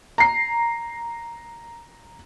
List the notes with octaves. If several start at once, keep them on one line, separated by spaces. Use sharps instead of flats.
A#5 C7